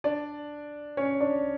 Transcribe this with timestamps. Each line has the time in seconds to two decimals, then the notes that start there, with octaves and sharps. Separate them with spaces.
0.04 D4 D5
0.97 C#4 C#5
1.20 D4 D5